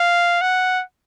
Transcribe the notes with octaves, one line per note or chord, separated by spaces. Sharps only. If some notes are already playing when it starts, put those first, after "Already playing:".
Already playing: F5
F#5